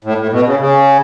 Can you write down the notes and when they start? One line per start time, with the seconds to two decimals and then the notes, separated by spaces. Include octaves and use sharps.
0.04 A2
0.18 A2
0.32 B2
0.46 C#3
0.60 C#3